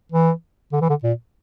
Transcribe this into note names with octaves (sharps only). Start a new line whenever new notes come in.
E3
D3
E3
D3
A#2